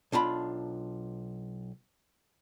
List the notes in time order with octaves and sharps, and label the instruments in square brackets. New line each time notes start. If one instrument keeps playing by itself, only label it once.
[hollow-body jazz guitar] B1 D4 F4 A5 B5